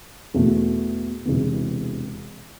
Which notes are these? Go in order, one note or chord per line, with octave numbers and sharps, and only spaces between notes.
E2 B2 A3
E1 E2 C3 E3 B3